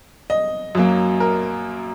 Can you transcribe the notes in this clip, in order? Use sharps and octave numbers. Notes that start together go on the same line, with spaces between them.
D#5
F#2 F#3 A#3
A#4